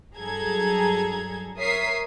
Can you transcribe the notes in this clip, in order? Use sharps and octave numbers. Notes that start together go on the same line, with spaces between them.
G2 F#3 G#4 A4 A#5 G#6
A#4 C#5 E5 D#6 B6 C7